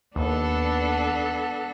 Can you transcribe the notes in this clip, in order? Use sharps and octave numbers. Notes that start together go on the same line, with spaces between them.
D#2 B3 D4 A4